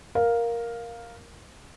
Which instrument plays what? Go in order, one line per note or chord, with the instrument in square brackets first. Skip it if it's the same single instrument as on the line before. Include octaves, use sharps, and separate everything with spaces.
[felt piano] A#4 F5